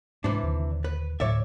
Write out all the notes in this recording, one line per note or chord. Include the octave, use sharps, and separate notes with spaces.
G#2 C3 E3 D4
D#1 D#2 D3
B4
D2 A2 F#3 C#5 D5 E5